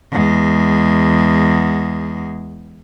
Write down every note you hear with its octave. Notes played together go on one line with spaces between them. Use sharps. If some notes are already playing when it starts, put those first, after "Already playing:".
E2 G#3